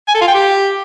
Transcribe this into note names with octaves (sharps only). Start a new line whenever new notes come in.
G#5
A4
F4
G5
G4